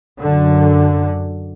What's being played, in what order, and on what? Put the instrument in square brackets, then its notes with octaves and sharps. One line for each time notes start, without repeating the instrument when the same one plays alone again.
[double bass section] F#2 D3